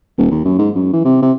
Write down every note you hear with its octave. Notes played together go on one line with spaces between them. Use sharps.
D#1
D#2
F#2
G#2
F#2
E3
C3
C3